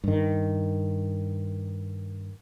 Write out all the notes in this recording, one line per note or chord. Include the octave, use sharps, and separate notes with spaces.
G2 D#3